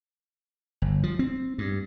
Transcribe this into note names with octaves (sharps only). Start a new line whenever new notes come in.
G1
F3
C4
G2